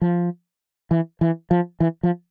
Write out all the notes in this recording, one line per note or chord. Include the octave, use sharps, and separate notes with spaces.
F3
E3
E3
F3
E3
F3